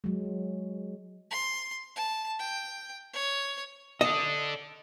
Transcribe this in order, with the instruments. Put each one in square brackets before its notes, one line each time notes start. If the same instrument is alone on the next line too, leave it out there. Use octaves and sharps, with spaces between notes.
[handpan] F#3 G#3
[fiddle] C6
A5
G5
C#5
[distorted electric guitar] D4 A4 [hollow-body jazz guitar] D#5